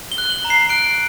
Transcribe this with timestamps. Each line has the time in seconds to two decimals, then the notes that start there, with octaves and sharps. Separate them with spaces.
0.12 G7
0.18 F#6
0.30 F#7
0.45 A#5
0.50 C7
0.69 F#6 D7